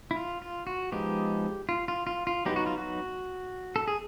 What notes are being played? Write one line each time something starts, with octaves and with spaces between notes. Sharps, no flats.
E4
F4
F4
F#4
F3 G#3 B3 D#4 G4
F4
F4
F4
F4
F#3 B3 D#4 G4
F#4
F4
F#4
A4
G#4